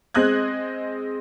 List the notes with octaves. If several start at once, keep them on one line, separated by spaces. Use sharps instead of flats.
G#3 C4 D#5 D#6 F#6 G#6